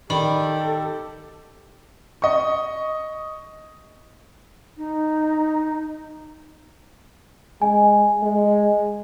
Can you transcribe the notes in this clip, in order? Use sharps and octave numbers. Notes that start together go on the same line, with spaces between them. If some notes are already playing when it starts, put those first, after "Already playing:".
D#3 G4 A4 D5 B5
D#5 C#6
D#4
G#3 G#5
G#3